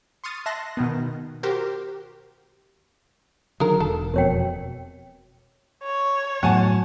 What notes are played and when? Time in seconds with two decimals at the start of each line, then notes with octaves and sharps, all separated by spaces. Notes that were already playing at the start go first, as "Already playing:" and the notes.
0.24 C6 C#6 D#6 F6 A6
0.46 E5 A5 C6 F#6 A#6
0.77 B2 D#3 B3
1.43 F#4 G4 A#4 C5
3.60 D3 D#3 F#3 G#3 A#4
3.80 E1 A4
4.14 F2 B2 A#4 C#5 G5
5.84 C#5
6.43 A2 F#3 B3 F#5 G#5 A5